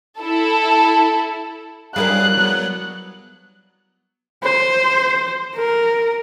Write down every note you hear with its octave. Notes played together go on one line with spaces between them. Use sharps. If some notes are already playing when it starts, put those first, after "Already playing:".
E4 A4
F#3 G3 E4 G#4 A#4 F5 F#6
F#3 B3
C5
A#4